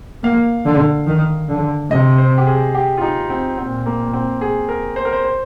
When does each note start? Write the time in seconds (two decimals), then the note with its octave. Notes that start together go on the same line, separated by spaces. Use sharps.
0.23 A#3 F5
0.65 D3
1.07 D#3
1.49 D3
1.90 C3 D#5
2.18 C5
2.38 G4
2.47 G#4
2.75 G4
2.97 F4
3.02 D#4
3.30 C4
3.58 A#2 C4
3.86 A#3
4.13 C4
4.41 G#4
4.69 A#4
4.96 C5
5.05 A#4
5.13 C5
5.24 C5